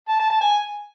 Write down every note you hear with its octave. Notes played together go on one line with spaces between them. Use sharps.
A5
A5
A5
G#5